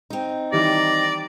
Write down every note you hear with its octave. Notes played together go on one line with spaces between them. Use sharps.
C4 D#4
D#3 E3 G3 D5 A#6